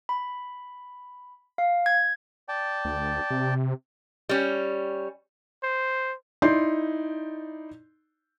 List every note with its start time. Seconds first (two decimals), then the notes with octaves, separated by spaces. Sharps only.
0.09 B5
1.58 F5
1.86 G#6
2.49 D5 G5 A5
2.85 D2
3.31 C3
4.29 G3 C#4
5.63 C5
6.42 D#4 E4 D5 C6 G6 C7